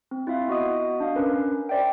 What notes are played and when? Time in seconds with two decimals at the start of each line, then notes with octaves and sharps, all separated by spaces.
0.11 C4
0.27 E4 F4 E5 F5
0.48 B3 F#4 D#5 D#6
1.00 D4 F5
1.16 C#4 A#4 B4
1.69 C5 D5 E5 G5